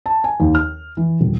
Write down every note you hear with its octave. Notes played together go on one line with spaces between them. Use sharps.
A5
G#5
D#2
F6
E3
D#1